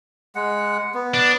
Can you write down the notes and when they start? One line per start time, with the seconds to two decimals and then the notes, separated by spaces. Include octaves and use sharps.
0.35 G#3 F#5
0.94 B3
1.14 D4